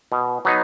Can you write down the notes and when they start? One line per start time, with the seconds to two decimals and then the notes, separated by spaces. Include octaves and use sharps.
0.12 B2
0.45 F#3 B3 D#4